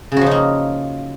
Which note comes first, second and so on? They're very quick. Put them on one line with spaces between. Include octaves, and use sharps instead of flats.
C#3 F#4 F3 D#4 A#3